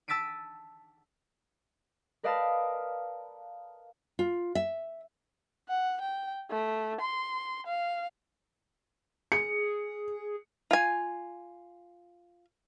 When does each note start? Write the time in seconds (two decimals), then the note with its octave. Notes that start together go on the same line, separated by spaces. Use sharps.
0.08 A5 E6 A6 B6 D7 D#7
2.23 A#4 B4 D5 D#5 F5 A5
4.19 F4
4.55 E5
5.69 F#5
6.01 G5
6.50 A3
7.01 C6
7.66 F5
9.32 G#4 C#7
10.71 F4 G#5